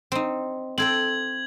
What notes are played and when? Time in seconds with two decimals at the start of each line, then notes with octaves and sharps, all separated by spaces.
0.12 C4 D#4
0.78 C4 A4 G5 G#6 F#7